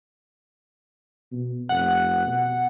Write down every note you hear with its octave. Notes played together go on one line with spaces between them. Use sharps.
B2
F1 F#5
B2